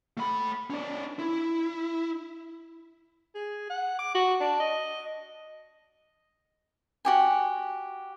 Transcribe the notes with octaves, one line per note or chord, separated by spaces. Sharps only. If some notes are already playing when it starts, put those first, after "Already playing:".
A3 B5
C#4 D5
E4
G#4
F#5
D6
F#4
D4
D#5
F#4 G4 G#5